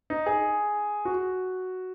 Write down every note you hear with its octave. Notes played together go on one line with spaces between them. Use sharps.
D#4
G#4
F#4